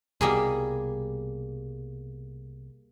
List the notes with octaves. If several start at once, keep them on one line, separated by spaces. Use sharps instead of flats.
C2 B2 G3 A#3 G#4